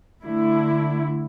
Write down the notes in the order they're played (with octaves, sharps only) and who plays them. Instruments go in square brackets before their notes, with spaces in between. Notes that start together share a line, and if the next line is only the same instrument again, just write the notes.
[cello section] D3 A3 E4